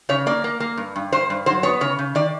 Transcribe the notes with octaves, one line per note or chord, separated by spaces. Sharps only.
C#3 C#5
A#3 D5
A#3
A#3
G2
G2
G2 C5
G2
F#3 C5
B3 C#5
C#3 C#5
C#3
D#3 D5